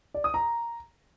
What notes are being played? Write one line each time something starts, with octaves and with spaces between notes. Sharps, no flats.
D5
D#6
A#5